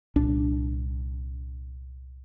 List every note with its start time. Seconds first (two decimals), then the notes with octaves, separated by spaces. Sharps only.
0.16 C2 A#2 D4